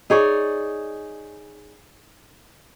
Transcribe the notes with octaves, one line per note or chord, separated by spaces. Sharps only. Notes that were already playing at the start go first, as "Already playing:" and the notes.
D#4 G#4 C#5 D5